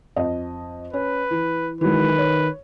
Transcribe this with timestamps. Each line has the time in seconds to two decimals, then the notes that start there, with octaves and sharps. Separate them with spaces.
0.16 F2 D#5
0.93 C#4 B4
1.31 E3
1.81 D#3 E3 F#3 G#3 B4
2.18 C#5